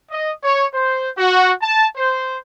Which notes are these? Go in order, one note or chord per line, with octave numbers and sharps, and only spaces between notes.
D#5
C#5
C5
F#4
A5
C5